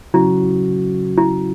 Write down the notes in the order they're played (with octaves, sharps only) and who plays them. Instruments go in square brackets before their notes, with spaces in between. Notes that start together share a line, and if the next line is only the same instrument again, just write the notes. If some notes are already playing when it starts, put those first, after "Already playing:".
[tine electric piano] C#3 F#3 C#4 F#4 [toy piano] E4
[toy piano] E4